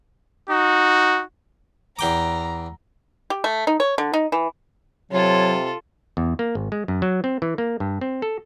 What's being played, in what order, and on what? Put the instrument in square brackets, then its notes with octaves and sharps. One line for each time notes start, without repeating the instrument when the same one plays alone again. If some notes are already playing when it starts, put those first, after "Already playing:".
[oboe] D#4 [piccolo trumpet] F#4
[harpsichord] E2 G5 D6 [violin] A#5
[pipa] G4
A3
D#4
C#5
D3
D#4
E3
[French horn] C3 [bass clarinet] F#3 [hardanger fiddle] F4 A4 [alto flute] C#5
[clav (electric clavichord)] E2
A#3
G#1
G#3
F#2
F#3
C4
E3
A#3
G2
C4
A4